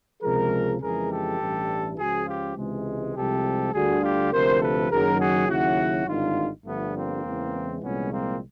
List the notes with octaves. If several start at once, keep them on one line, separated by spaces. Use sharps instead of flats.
C#2 C3 F3 G#3 G#4 A#4
F2 C#3 E3 G#3 G#4 A#4
G4 A4
A1 G2 E3 G3
C#2 C#3 F3 F#4 G#4
F4 G4
C#2 C3 E3 G#3
C2 C3 F3 G#3 G4 A4
D2 D3 G3 F#4 G#4
F4 G4
D2 C3 F3 A#4 C5
A4 B4
F#1 F#2 D#3 F#3 G#4 A#4
F#4 G#4
D#2 C#3 F#3 E4 F#4
G#1 G2 D3 D#4 F4
G1 G2 D3 F3 A3 B3
A#3 C4
E2 C#3 E3 G#3
C2 A#2 F3 G#3 B3 C#4
A#3 C4